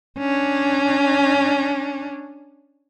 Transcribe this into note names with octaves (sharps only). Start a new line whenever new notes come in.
C#4 D4